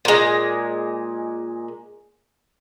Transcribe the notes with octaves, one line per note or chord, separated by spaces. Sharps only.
A#2 G#3